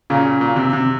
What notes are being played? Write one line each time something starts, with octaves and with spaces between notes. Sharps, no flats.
A#2 C#3
A#2
C3
C3